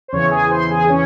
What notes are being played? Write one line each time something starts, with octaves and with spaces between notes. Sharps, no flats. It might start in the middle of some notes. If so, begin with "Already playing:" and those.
C5
E2 C#3 E3 C#4 C#5
G#4 G#5
C5 C6
G#4 G#5
C#4 C#5